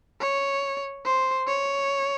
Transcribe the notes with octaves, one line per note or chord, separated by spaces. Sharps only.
C#5
C5
C#5